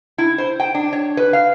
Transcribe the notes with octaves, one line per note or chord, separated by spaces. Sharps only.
E4
C5
G5
D4
C#5
B4
F5